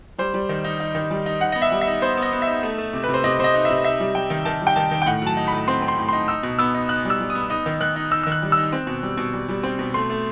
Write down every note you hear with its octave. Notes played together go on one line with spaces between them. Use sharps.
G3 C5
G3
D#3
D#4
D#4
D#3
G3
D#4
D#4 F#5
B3 D#5
E5
G3
E5
D#4
B3 C5
B3 D#5
B3
E5
D#4
A3
A3
C3
B4
C3
C5
C3 D#5
C3 C5 D#5
D#4
C3 E5
D#4 E5
G3
G3 G5
D#3
D#3 A5
G3
G5
D#3 A5
D#3
G5
A2 F#5
F#3 A5
D#4
A2 B5
C4 C6
C4
C6
A2
D#4 C6
D#4 E6
B2
B3 E6
D#4
D#4 F#6
G3
E6
G3
D#6
B3
D#4 D#6
D#3
D#3 F#6
D#4
D#4 E6
D#3 E6
F#6
G3
D#4 E6
C4
B2
G3
B2
G3
G3
C4
B2
A3 C6
A3